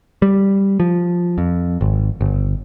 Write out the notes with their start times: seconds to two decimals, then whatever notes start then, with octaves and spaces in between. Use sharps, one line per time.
0.22 G3
0.80 F3
1.38 F2
1.81 G#1
2.21 G1